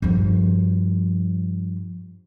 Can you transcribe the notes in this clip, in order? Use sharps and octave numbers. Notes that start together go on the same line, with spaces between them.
G2 F3